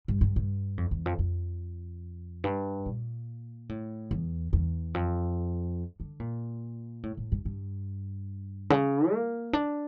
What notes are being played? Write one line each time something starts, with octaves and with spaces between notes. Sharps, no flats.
G2
G2
G2
F2
E2
F2
F2
G2
A#2
A2
E2
E2
F2
D3
A#2
A2
A2
G2
G2
C#3
A#3
D4